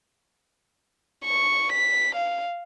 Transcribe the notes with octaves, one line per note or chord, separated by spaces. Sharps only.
C#6
B6
F5